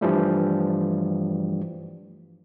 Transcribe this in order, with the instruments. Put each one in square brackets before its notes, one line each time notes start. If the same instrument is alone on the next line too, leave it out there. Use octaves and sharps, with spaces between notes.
[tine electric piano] G2 E3 F3 G3 A3